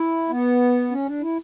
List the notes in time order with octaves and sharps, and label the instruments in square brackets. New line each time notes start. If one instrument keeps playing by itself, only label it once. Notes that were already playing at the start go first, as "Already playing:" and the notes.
Already playing: [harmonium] E4
B3
C#4
D4
E4